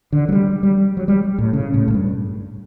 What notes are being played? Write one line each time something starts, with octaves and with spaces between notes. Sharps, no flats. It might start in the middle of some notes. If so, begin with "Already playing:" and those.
D3
F#3
G3
G3
F#3
G3
A2
C#3
A2
A2
G2